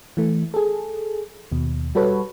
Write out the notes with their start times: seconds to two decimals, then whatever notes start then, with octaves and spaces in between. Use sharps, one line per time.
0.17 E3 A3
0.54 G#4 A4
1.52 D#2 B2
1.95 G3 F#4 A4 B4 C#5